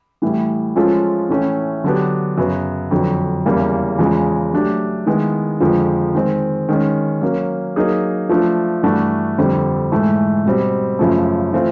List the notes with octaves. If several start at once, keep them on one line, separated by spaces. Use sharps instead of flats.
A2 E3 G3
F3 G#3 C#4 F4 A4
A2 E3 A3 C#4
D3 F#3 B3 D4 G4
F#2 C#3 F#3 B3
F2 D3 F#3
E2 C#3 E3 G3 A#3
E2 C#3 F3 G#3
F#3 A3 D4 G4
D#3 G#3 B3 E4
F2 D3 F3 G#3
D#3 G#3 C4
D#3 G#3 C#4
F#3 A#3 C#4
F#3 A#3 D#4 G#4
F3 A3 D4
G2 E3 A3 D4 F#4
F2 D3 G3 C4
G#2 E3 A3
B2 G3 C4
F#2 C#3 F3 A3
E3 A3 C4 F4